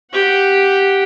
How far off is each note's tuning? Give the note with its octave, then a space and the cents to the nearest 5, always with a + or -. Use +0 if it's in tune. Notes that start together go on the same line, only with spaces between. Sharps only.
G4 +0 F#5 +0